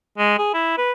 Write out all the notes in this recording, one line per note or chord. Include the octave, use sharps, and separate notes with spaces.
G#3
G#4
E4
B4